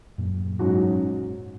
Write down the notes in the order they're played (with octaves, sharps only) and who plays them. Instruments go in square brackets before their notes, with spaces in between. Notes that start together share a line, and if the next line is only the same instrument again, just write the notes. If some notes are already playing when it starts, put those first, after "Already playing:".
[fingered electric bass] F#2 A#2
[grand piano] G#2 F#3 C#4 F#4